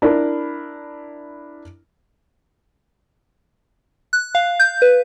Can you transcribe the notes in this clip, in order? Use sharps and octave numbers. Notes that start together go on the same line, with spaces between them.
D4 E4 A#4
F#6
F5
G6
B4